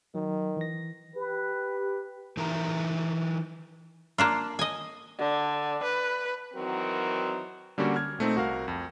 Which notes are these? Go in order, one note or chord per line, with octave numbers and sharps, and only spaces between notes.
D#3 F#3
E3 A#6
G4 B4
E3 D#4 E4 A#4 A#5
A#3 D4 F4
D#5 G#5
D3
B4
D#3 E3 F#3 C4 F#4 A#4
D3 G3 A#3 C#4 F#4
F6 G#6
A#2 A3 C4 D#4
C2 F#4 A#4 F5
F2